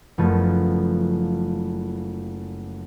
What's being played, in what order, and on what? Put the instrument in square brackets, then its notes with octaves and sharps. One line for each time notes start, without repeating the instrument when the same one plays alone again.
[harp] F#1 F3 A3 B3